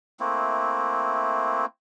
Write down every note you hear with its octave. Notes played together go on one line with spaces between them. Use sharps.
A3 A#3 C4 E4